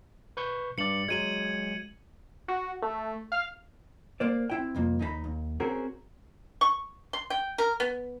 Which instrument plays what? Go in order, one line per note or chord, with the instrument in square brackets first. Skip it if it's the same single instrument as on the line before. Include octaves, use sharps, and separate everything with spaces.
[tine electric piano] B4 C#6 G6
[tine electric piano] G2 D5 [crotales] C#7 F#7
[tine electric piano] F#3 G#3 [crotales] G#6 D#7 F#7
[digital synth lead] F#4
A3
F5
[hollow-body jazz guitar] A#3 C5 D5
C4 E4 G5
C2 F2 A#3
D#2 D#4 G#4 B5
D#2
C4 C#4 F#4 G#4 A#4
[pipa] C#6
C6
G5
A#4
B3